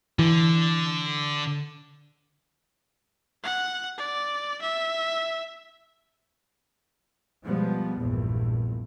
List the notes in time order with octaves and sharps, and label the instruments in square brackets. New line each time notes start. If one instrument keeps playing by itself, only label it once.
[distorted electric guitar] D3 [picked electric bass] E3
[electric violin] F#5
D5
E5
[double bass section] B2 F3 G3 G#3 B3
A#1 E2 G2